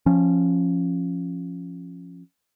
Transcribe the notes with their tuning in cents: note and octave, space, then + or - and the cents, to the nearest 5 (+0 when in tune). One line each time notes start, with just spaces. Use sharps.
F3 +0 C#4 -15